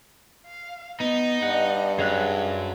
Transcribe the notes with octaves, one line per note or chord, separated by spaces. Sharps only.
F5
B3 D#4 D#5
G2 F#5
F#2 G#4 C#5 F#6